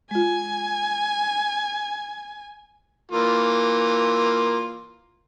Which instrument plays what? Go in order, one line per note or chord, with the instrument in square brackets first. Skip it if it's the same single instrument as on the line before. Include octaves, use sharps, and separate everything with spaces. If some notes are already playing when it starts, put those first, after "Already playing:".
[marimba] G#3 F4 [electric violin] G#5
[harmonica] E3 A#3 F4